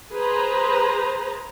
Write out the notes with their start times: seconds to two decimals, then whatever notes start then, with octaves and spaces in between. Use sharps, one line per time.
0.12 G#4 B4 C5 A#5